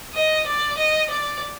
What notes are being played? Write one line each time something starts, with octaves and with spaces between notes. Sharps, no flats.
D#5
D5
D#5
D5